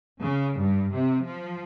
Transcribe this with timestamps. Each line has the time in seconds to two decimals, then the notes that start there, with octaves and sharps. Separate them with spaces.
0.23 C#3
0.61 G2
0.94 C3
1.25 F3